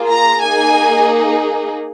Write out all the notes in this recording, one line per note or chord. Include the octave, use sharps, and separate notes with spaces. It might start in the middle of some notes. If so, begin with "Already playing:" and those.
Already playing: A#3 F4 G#4
A#5
A#3 D#4 G#4 G#5